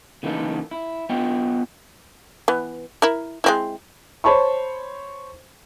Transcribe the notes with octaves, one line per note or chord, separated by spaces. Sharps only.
C#3 E3 A#3 D#4 A4
E4
B3 F4 D#5 G5
E3 B3
E4 A#4
G#3 C4 E4
C5 C#5 A5 B5 C#6